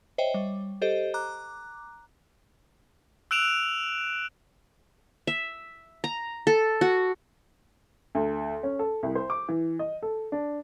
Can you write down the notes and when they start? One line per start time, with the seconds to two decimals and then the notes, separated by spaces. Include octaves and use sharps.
0.18 C5 C#5 D#5 E5 G5
0.34 G3
0.82 G4 A4 C5 D#5
1.14 A#5 D6 F#6
3.31 E6 F#6 D7 E7 F7
5.27 E5
6.04 A#5
6.47 A4
6.81 F#4
8.15 D2
8.63 C#4
8.79 A4
9.03 C2
9.15 C5
9.30 D6
9.49 E3
9.79 D#5
10.02 A4
10.32 D4